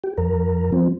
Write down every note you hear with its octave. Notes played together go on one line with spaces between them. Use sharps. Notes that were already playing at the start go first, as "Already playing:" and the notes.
G4
F2 A#4
F3 C4